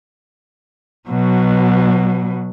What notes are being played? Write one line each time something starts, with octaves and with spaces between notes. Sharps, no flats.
B2 F#3